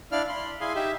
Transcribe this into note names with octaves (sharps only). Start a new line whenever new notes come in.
D4 E4 D5 F5 F6
B5 C6
E4 G#4 F5 G#5 C6
D#4 G4 E5